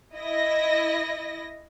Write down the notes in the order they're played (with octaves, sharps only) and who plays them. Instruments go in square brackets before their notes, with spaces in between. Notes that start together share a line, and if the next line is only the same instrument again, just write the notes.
[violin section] E4 D#5 A#6